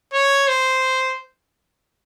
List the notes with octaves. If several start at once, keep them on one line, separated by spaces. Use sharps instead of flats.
C#5
C5